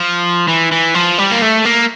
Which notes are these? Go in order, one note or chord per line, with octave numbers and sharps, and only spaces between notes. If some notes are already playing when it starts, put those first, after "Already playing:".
Already playing: F3
E3
E3
F3
G3
A#3
A3
A#3